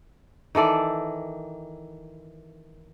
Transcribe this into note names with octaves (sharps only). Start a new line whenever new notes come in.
D#3 E3 A4 D5